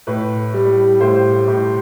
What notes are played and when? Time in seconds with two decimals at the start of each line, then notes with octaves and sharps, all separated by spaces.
0.07 A2 B4
0.54 G3
1.01 A2 C5
1.48 A2